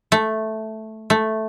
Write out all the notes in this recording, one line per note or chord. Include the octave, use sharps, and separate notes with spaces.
A3
A3